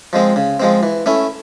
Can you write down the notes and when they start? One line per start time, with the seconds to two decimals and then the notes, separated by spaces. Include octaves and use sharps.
0.13 F3 G#3 C4
0.36 C#3
0.60 F3 G#3 C4
0.83 E3
1.06 A3 C#4 E4